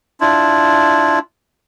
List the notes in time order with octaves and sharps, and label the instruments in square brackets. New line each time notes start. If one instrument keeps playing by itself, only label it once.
[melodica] D4 E4 F4